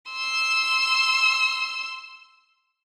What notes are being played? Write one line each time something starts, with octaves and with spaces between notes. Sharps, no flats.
C6 E6